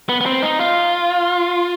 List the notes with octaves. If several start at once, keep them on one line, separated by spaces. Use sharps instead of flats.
B3
B3
C4
D#4
F4